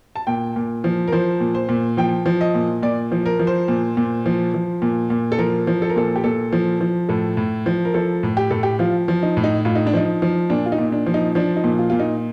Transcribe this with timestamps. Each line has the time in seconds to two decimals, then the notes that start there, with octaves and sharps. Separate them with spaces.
0.16 A5
0.27 A#2 G5
0.56 A#2
0.84 F3
1.08 A#4
1.12 F3 C5
1.40 A#2
1.55 C5
1.69 A#2
1.97 F3 G5
2.26 F3
2.41 D#5
2.55 A#2
2.83 A#2 D5
3.12 F3
3.26 A#4
3.39 F3
3.47 C5
3.68 A#2
3.97 A#2
4.26 F3
4.54 F3
4.82 A#2
5.10 A#2
5.32 A4
5.38 F3 A#4
5.67 F3
5.82 A4
5.89 A#4
5.96 A#2 A4
6.16 G4
6.24 A#2 A4
6.53 F3
6.81 F3
7.09 A2 A4
7.37 A2
7.66 F3
7.85 A#4
7.94 F3 A4
8.23 A2
8.37 G4
8.50 A2 A4
8.63 G4
8.79 F3 F4
9.08 F3
9.23 D#4
9.37 A2
9.44 D#4
9.65 A2 F4
9.75 D#4
9.86 D4
9.93 F3 D#4
10.22 F3
10.50 A#2 D4
10.66 F4
10.72 D#4
10.78 A#2
10.92 D4
11.07 F3
11.14 D#4
11.35 F3 D4
11.56 D#4
11.64 A#2
11.79 F4
11.90 A#2 F4
11.99 D#4